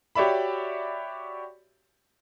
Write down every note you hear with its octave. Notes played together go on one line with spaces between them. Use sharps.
F#4 G4 C#5 D5 E5 B5